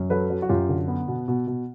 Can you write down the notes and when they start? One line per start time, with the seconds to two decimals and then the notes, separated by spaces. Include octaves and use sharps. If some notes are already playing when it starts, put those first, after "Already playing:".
Already playing: F#2
0.10 F#3 A4 B4
0.30 F#3
0.42 F#4
0.49 F#2 F4 G4
0.69 D3
0.88 B3
1.08 B2
1.28 B2
1.47 B2